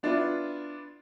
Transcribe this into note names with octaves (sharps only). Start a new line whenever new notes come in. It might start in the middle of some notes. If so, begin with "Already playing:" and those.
B3 D4 E4 F4 B4